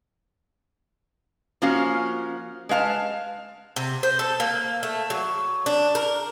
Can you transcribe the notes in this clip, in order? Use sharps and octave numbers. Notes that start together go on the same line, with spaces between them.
F3 A#3 C#4 F#4 F5
G#3 B4 F5 A5
C3
C5
A4
A#3
A3
F#3
D4
A#4